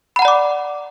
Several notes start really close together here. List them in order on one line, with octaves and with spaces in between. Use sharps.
B5 F#5 A#5 D5 D6